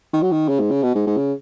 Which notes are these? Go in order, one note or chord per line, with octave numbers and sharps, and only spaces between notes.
D#3
F#3
D#3
C#3
G#2
C#3
B2
G#2
G#2
C#3